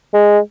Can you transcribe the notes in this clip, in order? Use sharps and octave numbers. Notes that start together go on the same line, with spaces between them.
G#3